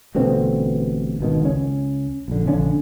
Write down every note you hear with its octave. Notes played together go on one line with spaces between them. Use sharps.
A1 B2 D3 C4
G#1 B2 D#3
C#2 C#4
A#1 D3
A#1 D3 C#4 D4